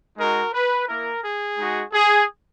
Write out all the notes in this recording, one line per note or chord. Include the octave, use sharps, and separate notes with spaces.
G#3 D#4 F#4 A#4
B4
A#3 E4 A#4
G#4
G#3 D#4 F#4
G#4